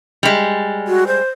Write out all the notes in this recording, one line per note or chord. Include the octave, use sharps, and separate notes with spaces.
G3 G#3
F#4
C5